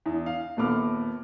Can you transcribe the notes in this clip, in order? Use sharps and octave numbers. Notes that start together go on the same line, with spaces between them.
E2
F5
A#1 D#2 B3 A4 D6 F6